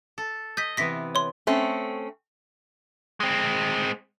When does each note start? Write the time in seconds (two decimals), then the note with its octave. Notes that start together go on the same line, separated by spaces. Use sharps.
0.18 A4
0.57 D#5 G6 B6
0.77 C3 E3 B3 A#6 B6
1.15 C#5 C6
1.47 A3 C4 C#4
3.20 G#3 C4